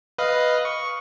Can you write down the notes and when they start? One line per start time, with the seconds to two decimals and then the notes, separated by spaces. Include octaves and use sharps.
0.18 B4 D#5 F5
0.65 C#6